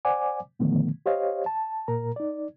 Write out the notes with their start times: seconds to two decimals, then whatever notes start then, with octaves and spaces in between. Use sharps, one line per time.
0.05 C5 D5 F#5 G#5 D6
0.59 A#2 D3 D#3 F3 A3 B3
1.06 G4 C5 C#5 D#5 F5
1.46 A5
1.88 A#2 A#4 A#5
2.16 D#4 D5